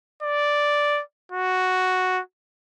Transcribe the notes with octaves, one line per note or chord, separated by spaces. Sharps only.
D5
F#4